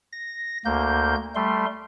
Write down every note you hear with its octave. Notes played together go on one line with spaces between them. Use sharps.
A#6
D2 A#3 G6
G3 A3 C6